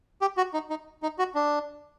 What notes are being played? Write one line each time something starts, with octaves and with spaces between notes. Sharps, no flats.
G4
F#4
D#4
D#4
D#4
F#4
D4